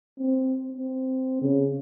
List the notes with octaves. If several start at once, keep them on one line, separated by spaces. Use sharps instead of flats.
C4
C4
C#3